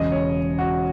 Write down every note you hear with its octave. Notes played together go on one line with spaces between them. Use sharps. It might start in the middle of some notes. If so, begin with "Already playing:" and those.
Already playing: E1 E2 C#3 D#5
C#5
F#4